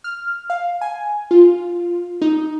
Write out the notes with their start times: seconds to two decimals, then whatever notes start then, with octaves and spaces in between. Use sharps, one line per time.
0.04 F6
0.50 F5
0.81 G#5
1.31 F4
2.22 D#4